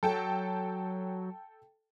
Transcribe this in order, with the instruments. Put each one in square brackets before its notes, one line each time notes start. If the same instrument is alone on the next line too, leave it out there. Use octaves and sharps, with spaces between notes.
[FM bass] F#3 [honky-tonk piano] A4 G5 A5